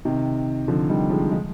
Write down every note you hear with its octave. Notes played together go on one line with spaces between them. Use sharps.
C3 D#3
D3 F3
D#3 G3
F3 G#3
F3 G#3